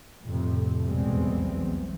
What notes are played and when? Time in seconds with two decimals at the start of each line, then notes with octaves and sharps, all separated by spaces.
0.24 F2 A2 C3
0.83 B1 E2 G3 G#3 C4
1.55 E2